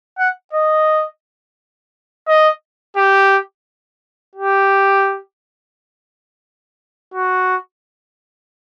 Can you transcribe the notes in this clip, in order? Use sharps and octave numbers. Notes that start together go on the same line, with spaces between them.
F#5
D#5
D#5
G4
G4
F#4